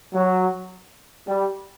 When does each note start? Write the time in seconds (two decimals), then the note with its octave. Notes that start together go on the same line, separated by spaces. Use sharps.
0.14 F#3
1.28 G3